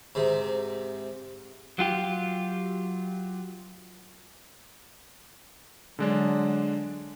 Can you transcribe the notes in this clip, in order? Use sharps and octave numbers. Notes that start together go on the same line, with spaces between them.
G#2 C3
F#3 F4 G4
D3 F#3 G#3 D4